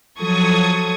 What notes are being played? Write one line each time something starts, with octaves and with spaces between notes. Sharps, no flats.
F3 F#3 A4 C#6 D#6 G#6